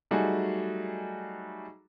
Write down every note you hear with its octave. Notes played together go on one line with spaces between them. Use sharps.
F#3 G3 A3 D#4 F#4 G#4